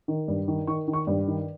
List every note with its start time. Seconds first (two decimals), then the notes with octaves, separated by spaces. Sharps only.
0.08 D#3
0.28 G2
0.48 D#3
0.67 D#3 C#6
0.88 D#3
0.93 C#6
1.07 G2
1.27 D#3